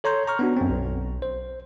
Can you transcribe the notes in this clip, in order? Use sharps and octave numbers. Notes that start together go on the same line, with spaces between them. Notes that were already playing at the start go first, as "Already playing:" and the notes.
A4 C#5 A#5 C6 G6
A#5 C#6 F6
B3 D4 F#4
F#2 C4
B1
C5